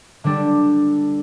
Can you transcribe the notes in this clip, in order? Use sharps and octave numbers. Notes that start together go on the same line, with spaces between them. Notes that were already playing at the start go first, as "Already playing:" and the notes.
D3 G3 D4 A4